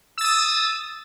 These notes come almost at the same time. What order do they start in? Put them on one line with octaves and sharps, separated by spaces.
E6 A6 D#6